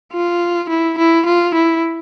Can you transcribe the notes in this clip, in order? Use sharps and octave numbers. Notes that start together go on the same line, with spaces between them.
F4
E4
E4
F4
E4